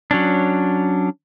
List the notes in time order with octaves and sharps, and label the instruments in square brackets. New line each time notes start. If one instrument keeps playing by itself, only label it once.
[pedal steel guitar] F#3 C#4 D4